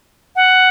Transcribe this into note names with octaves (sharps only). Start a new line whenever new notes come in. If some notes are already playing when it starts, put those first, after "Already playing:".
F#5